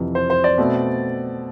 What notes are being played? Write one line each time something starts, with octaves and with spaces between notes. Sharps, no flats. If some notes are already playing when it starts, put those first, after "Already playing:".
Already playing: F2 C3 E3
C5
C5
D5
B2 A3 C4